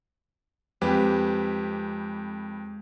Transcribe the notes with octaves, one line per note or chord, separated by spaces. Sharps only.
F2 G#3 G4 B4